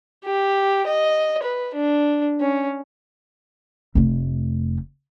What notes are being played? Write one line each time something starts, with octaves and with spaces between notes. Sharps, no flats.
G4
D#5
B4
D4
C#4
F1 A3